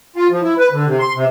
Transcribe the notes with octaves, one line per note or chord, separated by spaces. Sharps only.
F4
F3
E4
B4
D3
C3
C6
C3